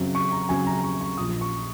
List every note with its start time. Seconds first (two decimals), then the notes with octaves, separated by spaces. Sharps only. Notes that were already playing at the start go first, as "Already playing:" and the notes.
Already playing: F#2 C#3 F#3 C4
0.15 C#6
0.32 A#5
0.49 F#2 C#3 F#3 C4 G#5
0.67 A#5
0.83 C#6
1.01 C#6
1.18 A#1 A#2 F3 D#6
1.41 C#6